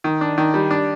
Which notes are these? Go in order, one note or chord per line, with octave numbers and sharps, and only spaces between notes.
D#3
D4
D#3
G3
D4